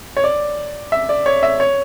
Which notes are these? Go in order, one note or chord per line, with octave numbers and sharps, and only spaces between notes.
C#5
D5
E5
D5
C#5
E5
C#5